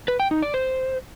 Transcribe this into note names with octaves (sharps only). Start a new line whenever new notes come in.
B4
G5
D#4
D5
C5